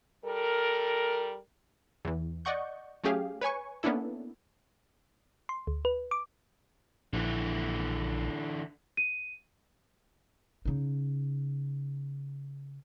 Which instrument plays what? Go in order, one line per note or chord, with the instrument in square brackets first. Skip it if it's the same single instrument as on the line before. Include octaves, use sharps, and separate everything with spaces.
[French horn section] G3 A4 A#4
[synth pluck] E2 E3
D5 D#5 F#5 C#6 G6
F#3 A3 C#4 G4 G#4 F5
B4 C#5 G#5 C#6
A#3 B3 C#4 D4 E4 A4
[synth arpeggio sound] C6
D2
B4
D6
[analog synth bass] A#1 [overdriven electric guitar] D3 E3
[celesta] D#7
[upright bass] C#3 D#4